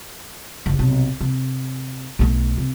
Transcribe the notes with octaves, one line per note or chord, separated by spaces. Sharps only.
F#1
B1 C3
C3
B1 A3
C3